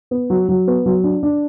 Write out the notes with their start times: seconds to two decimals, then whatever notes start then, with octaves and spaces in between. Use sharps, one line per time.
0.11 B3
0.30 F#3
0.48 F#3
0.67 B3
0.86 F#3
1.04 D4
1.23 D4